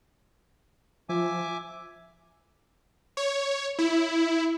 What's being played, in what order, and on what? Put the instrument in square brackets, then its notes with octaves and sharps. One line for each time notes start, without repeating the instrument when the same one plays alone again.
[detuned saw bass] F3 [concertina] E5 G#5 D6
[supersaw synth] C#5
E4